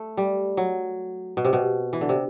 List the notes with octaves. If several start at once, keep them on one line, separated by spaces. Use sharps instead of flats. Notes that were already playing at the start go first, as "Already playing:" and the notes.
Already playing: A3
G3
F#3
B2
C3
B2
E3
D3
C3